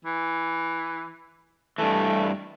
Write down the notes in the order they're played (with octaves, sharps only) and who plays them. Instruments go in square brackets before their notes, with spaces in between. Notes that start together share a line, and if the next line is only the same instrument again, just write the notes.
[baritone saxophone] E3
[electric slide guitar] G2 E3 [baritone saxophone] A3